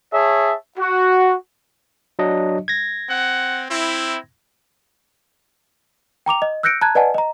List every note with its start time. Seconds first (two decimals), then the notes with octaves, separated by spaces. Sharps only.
0.13 G#4 C#5 E5 A5
0.78 F#4
2.19 F#3 D4 D#5
2.68 G#6 A#6
3.08 C4 F#5
3.69 C4 E4
6.26 G5 A#5 D6 F7
6.42 D#5
6.63 E6 F#6 G6 A#6 C#7 D7
6.81 A5 A#5 F#6 G#6
6.95 B4 D5 D#5 F#5 G#5 A5
7.14 D#5 A#5